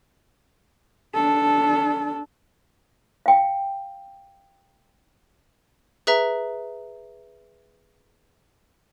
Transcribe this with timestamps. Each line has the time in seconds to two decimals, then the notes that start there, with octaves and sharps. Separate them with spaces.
1.14 D4 A4
3.26 F5 G5
6.07 G#4 B4 E5 A#5